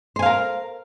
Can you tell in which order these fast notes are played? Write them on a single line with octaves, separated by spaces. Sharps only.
C5 G#5 F5 A#4